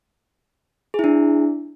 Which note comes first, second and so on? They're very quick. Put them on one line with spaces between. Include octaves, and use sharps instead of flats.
G#4 E4 D4